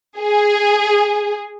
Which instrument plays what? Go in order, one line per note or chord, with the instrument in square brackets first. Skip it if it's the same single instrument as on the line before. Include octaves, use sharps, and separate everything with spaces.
[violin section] G#4